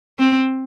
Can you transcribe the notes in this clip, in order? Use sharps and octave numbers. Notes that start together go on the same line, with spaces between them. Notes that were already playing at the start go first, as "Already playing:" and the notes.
C4